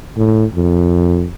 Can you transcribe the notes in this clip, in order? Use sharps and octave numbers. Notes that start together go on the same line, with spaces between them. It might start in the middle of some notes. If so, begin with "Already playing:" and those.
A2
F2